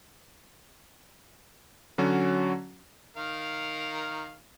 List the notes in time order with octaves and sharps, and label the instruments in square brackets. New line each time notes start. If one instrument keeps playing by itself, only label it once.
[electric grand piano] D3 F#3 C#4 F#4
[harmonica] D#3 A#4 F5